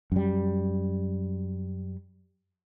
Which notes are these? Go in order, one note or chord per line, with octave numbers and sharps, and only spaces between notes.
F#2 G3